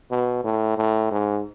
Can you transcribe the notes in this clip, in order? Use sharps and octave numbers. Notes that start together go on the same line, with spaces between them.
B2
A2
A2
G#2